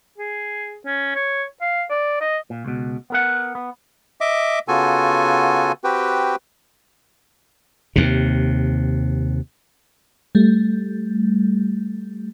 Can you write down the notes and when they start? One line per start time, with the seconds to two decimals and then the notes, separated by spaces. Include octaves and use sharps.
0.18 G#4
0.86 C#4
1.15 C#5
1.61 F5
1.90 D5
2.21 D#5
2.50 A#2
2.65 C#2 B2
3.10 B3 A#4 F#5
3.55 B3
4.21 D#5 E5 D6
4.68 C#3 B3 F4 F#4 A4 G#5
5.84 C4 F#4 G4 B4 G5
7.96 D#2 C3
10.35 G3 A3